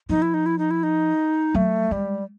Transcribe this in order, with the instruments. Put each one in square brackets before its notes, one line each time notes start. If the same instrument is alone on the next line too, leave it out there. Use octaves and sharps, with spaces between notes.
[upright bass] F3 [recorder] D#4
[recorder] E4
D#4
E4
D#4
E4
D#4
[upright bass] F#3 [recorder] A3
[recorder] G3 [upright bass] G#3